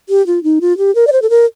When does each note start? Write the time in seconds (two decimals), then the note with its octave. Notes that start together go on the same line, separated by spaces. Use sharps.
0.09 G4
0.27 F4
0.44 D#4
0.61 F4
0.78 G4
0.95 A#4
1.07 D5
1.12 C5
1.22 A4
1.30 A#4